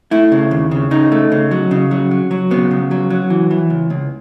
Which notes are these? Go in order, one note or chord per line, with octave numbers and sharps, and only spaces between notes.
A3 E4
C#3
D#2
C#3
C#3 D#4
A3
C#3
F#3
C#3
F#3
F#3
F#3
C#3 B3
C#3
F#3
F#3
E3
E3
C#2
C#2